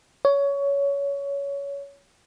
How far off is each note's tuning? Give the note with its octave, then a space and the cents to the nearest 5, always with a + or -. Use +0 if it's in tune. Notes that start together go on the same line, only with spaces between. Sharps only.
C#5 +20